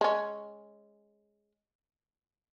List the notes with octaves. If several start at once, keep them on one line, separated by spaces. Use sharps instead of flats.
G#3 C#4